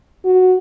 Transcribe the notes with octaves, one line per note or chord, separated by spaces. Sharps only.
F#4